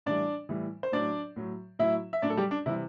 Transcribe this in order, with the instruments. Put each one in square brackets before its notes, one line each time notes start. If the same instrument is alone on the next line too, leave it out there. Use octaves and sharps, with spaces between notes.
[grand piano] A2 E3 G3 D4 D5
A2 E3 G3
C5
A2 F#3 D4 D5
A2 F#3
A2 F#3 E4 E5
E5
A2 F#3 D4 D5
A4
G3 G4
D4
C3 E3 G3 E4